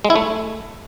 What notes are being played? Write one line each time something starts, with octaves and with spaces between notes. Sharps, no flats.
G#3
E4
A3